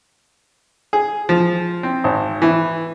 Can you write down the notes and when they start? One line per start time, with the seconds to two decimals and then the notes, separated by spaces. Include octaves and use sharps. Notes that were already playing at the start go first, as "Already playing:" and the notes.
0.93 G#4
1.29 F3
1.83 C4
2.04 G#1
2.42 E3